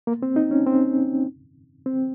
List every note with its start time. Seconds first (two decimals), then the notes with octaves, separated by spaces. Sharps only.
0.07 A#3
0.23 C4
0.36 D#4
0.51 C#4
0.67 C4
1.86 C4